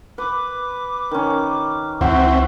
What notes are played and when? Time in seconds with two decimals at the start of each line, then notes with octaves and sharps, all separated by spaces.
0.18 B4 D6
1.11 D#3 C#4
2.01 C#2 E3 C4 F#4 G5